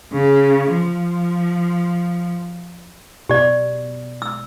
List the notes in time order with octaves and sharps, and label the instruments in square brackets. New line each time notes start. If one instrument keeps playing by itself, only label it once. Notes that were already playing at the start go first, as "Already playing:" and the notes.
[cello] C#3
F3
[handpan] B2 [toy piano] G4 D5
[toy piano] E6